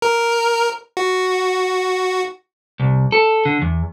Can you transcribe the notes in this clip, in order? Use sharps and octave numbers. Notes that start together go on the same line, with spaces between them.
A#4
F#4
C2
A4
D3
E2